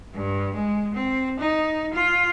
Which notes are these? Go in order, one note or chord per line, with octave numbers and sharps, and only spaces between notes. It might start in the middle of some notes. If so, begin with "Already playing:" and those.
G2
G#3
C4
D#4
F4